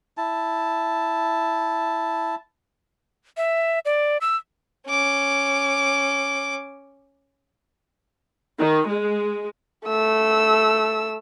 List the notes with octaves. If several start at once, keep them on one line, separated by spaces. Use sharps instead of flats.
E4 A5
E5
D5
E6
C#4 D6
D#3
G#3
A3 E6